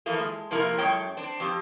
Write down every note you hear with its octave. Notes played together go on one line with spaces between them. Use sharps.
E3 F3 A3 A#3
G#3
C3 F3 A3 A#3 E4 A#4
F#2 G#3 A3 C#5 G5
C4 D4
F2 C4 G4